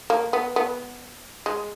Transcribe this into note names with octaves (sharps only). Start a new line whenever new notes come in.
A#3
B3
B3
G#3